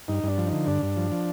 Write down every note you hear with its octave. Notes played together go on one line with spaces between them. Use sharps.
G2 D#4
G2 D4
F3
D#4
D3
G2 D4
G2
F3
F3